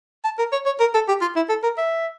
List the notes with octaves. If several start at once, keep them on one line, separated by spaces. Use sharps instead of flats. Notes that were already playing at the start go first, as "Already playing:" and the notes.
A5
A#4
C#5
C#5
A#4
A4
G4
F4
E4
A4
A#4
E5